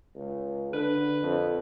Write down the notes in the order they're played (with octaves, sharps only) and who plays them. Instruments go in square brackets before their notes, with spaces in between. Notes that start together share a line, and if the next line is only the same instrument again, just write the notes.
[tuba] C#2
[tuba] D3 [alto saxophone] B4
[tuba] F2